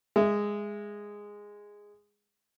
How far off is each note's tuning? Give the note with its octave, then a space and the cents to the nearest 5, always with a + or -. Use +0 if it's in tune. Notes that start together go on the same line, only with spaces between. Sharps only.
G#3 -10 E5 +0